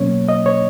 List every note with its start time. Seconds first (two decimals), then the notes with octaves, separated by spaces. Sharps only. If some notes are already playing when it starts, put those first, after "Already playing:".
Already playing: B2 F#3 A#3 C#4 C#5
0.29 D#5
0.46 C#5